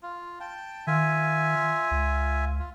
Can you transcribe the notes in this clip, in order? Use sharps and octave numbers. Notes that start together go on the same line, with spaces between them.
F4
G5 A5
D#3 F4 E5 G#5
C#2
F4